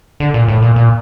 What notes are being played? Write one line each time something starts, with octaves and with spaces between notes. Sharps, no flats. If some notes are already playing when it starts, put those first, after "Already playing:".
D3
A#2
A2
A#2
A#2